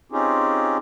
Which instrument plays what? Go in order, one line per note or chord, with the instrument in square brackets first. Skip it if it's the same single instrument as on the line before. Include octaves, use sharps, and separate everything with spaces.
[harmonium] C4 C#4 D#4 F4 G4 G#4